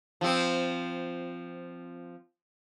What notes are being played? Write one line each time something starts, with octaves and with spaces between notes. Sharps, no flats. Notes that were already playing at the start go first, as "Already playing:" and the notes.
F3 C4